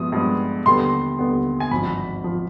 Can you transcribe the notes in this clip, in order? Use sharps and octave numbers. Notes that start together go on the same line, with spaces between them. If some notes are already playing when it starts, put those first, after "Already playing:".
Already playing: G2 F3 G#3 B3 D#6
G2 F3 G#3 B3
D#2 D3 G3 B3 C6
D#2 D3 G3 B3
G#5
G#1 G2 F3 B5
F3